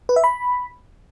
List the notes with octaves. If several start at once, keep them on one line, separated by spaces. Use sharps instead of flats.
B4
E5
B5